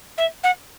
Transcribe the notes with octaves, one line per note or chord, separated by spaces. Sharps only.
E5
F#5